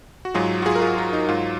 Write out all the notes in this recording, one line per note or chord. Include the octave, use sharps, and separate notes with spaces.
F#4
G#2 F#3 F4 G#4
F#4
F4 G#4
A#4
F4 G#4
F4
D#4
G#2 F#3 F4